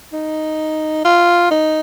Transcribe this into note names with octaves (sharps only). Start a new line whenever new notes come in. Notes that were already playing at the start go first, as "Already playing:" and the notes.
D#4
F4
D#4